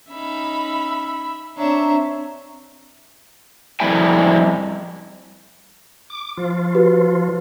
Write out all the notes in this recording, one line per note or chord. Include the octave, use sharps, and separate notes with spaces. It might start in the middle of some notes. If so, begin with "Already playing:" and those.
C#4 D#4 E5 B5
C4 D4 C#5 E5 A#5
F2 G3 E4 E5 G5 G#5
D6
F3 F4
F#4 G4 B4